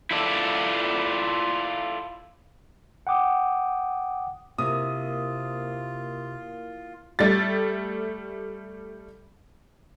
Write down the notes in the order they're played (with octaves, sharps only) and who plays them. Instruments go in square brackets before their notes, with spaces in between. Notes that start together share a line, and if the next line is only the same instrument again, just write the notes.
[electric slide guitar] E4 F4 A4 D5
[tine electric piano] F#5 G5 D6 D#6
[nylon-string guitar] C3 [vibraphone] A#3 E4 A#4 [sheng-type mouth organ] F4 [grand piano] D#6
[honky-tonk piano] G3 A3 A6